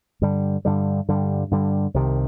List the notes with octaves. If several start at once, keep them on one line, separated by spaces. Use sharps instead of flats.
G2 D3 G3
G2 D3 G3
G2 D3 G3
G2 D3 G3
C2 C3 D#3